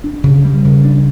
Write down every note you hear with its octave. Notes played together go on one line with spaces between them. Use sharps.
D4
C#3
G3
C#3
D4